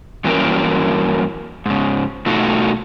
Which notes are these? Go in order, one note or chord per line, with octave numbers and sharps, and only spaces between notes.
G2 E3 F#3 A#3 C#4 A#4
G#2 C#3
B2 A3 D#4 F4 F#4